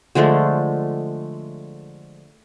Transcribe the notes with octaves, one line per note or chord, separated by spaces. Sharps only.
D3 F3 G#3 A3